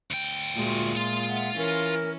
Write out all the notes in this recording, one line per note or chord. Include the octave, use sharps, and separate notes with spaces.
D2 G5
A#2 G#3 F4 F#4 E5
F4 E5 C6
E5 F#5
E3 C#4 A#4